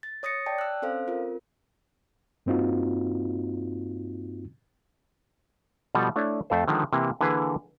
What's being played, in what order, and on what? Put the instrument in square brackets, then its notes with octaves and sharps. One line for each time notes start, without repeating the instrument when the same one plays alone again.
[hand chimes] A6
C#5 D#6 A6 A#6 C#7
D5 G5 A5
E6 F#6
C4 C#4 A4 C5 F5
C4 F4 A#4
[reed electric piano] G2 A#3 C4 D#4 F4 F#4
[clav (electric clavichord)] B2 F3 G3 A4
A3 D4 E4 C#5 D5
F2 A3 A4 C5
D3 D#3 F3 G#3
C3 E3 A#3
D3 E3 A#3 G#4 B4